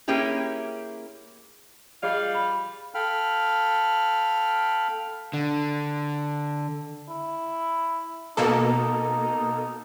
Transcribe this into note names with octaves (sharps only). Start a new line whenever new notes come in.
A#3 C#4 E4 G4 G#4
G3 F4 G#4 D5 D#5 F5
B5
A4 F5 G5 B5 F6
D3
E4
B2 A#3 D#4 A4